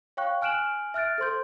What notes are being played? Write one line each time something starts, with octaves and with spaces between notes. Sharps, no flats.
C#5 F5 G5 C#6 F#6
G#5 F6 F#6 D7 E7 F#7
E5 F6 F#6 A6 D7
A4 C5 C6 G6